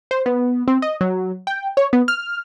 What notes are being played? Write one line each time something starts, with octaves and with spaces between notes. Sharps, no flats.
C5
B3
C4
D#5
F#3
G5
C#5
B3
F6